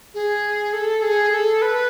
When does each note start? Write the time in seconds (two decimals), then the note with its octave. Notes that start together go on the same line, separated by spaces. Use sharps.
0.14 G#4
0.73 A4
1.03 G#4
1.32 A4
1.62 B4